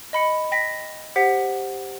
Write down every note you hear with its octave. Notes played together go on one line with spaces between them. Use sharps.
D#5 B5 C#7
G5 A#6 B6
G4 C5 F#5 B6